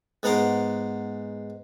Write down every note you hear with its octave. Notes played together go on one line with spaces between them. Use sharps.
G#2 B3 F#5 A#5 C6 D6